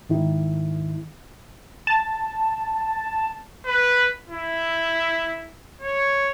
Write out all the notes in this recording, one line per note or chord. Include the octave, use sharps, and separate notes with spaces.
G#2 D#3 E4
A5
B4
E4
C#5